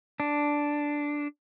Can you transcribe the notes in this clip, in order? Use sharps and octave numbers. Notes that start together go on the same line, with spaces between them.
D4